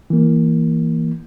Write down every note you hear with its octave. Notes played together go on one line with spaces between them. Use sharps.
E3 A#3